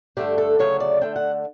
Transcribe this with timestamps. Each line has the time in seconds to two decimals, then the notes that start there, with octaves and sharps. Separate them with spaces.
0.17 G2 D3 A3 D4 G4
0.38 A4
0.59 D2 C#3 F#3 A3 C#5
0.80 D5
1.01 D3 A3 D4 G5
1.16 F#5